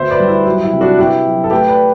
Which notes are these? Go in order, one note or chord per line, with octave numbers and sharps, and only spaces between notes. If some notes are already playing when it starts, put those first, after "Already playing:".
Already playing: D2 B3 C5 E5
B4 D5
G3
E4
F#3 E4
E4
C3
D4 F#4
B3 E4 G4
F#3
A4
A3 G4 B4
B4 D5